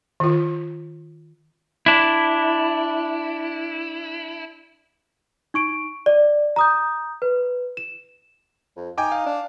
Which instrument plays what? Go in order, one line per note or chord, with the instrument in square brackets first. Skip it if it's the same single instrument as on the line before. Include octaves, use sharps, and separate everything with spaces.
[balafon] D#3 F4
[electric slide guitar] D4 E4
[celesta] D#4 C#6 D7
D5
A#5 D#6 G6
B4
E7
[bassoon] F2
[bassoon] D#4 [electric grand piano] G5 G#5 D6
[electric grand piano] F5
[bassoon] D4